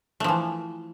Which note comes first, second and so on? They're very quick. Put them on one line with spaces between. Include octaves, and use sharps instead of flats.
A3 F3 E3